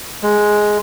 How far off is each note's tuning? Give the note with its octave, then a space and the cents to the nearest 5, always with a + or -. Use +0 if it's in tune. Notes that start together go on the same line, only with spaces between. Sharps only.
G#3 +5